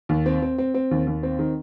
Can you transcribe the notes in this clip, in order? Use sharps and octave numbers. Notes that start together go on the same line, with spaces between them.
D#2
C4
C4
C4
C4
D#2
D#2
C4
D#3